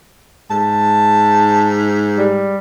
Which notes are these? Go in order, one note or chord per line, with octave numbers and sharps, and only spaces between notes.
G#2 A5
G3